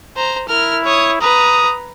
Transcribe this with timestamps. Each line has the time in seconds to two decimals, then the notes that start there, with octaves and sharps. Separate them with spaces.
0.16 C5 A#5
0.48 E4 A#4 F6
0.84 C#5 D#6
1.21 B4 A#5 D#6